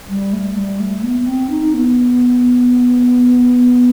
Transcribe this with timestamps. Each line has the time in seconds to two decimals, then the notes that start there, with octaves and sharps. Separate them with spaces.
0.09 G3
0.33 A3
0.56 G3
0.80 A3
1.03 B3
1.21 B3
1.27 C4
1.50 D#4
1.74 B3